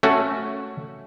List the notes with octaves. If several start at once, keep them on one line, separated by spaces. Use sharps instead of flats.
A3 C#4 F#4